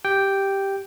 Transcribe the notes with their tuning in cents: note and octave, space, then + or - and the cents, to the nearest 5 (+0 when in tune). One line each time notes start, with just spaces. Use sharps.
G4 +0 G5 +0